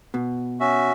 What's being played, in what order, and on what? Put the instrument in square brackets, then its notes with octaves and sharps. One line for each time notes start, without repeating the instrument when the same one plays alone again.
[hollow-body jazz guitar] B2
[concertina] C#4 F#4 E5